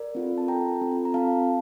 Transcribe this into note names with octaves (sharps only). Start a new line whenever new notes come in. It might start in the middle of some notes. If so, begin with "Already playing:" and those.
Already playing: A#4 D5
C4 F4 A4
A5
C4 F4 A4 G5 A#5
C4 F4 A4
A#5
C4 F4 A4 F5 A5